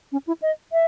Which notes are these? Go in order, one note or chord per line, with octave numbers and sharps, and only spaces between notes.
C#4
E4
D#5
E5